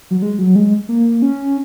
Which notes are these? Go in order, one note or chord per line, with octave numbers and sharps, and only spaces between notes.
F#3
G#3
F#3
G#3
A#3
C#4